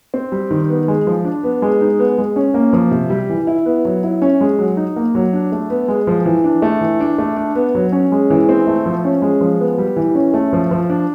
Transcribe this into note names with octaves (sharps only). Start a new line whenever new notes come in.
C4
G3
D#3
B3
G#3
F3
D4
B3
G#3
D#4
B3
G#3
C#4
A#3
F3
C3
G3
E3
E4
B3
F#3
E4
C#4
G#3
F#3
D#4
A#3
F#3
D4
A3
B3
G#3
F3
E3
D4
A3
E3
D4
A3
D4
B3
F#3
C#4
G#3
E3
C4
A3
F3
C#4
G#3
F3
B3
G3
E3
C#4
A3
F3
F3
D4